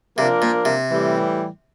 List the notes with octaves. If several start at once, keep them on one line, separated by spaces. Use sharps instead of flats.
C3 F3 A#3 D4 F4 A#4
A#2
C3
A2 E3 G3